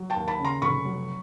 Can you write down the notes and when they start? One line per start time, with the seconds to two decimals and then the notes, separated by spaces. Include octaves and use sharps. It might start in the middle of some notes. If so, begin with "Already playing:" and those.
Already playing: F#3
0.10 G5 A5
0.16 D#2
0.28 A5 B5
0.39 C#3
0.45 A#5 C6
0.62 F1 B5 C#6
0.85 F#3